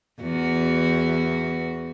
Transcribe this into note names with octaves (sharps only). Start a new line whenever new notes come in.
E2 F#4